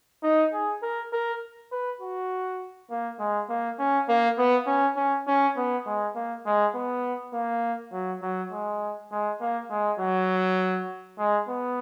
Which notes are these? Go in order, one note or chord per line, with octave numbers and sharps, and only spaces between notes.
D#4
G#4
A#4
A#4
B4
F#4
A#3
G#3
A#3
C#4
A#3
B3
C#4
C#4
C#4
B3
G#3
A#3
G#3
B3
A#3
F#3
F#3
G#3
G#3
A#3
G#3
F#3
G#3
B3